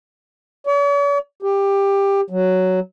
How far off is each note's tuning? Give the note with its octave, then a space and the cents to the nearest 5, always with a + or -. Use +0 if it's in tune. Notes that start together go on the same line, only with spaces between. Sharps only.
C#5 +45
G4 +15
F#3 +5